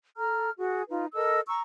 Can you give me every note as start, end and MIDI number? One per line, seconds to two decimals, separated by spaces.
0.17 0.51 69
0.17 0.51 82
0.17 0.51 89
0.57 0.82 66
0.57 0.82 68
0.89 1.07 63
0.89 1.07 65
0.89 1.07 71
1.14 1.40 69
1.14 1.40 70
1.14 1.40 75
1.14 1.40 88
1.48 1.62 82
1.48 1.62 85
1.48 1.62 88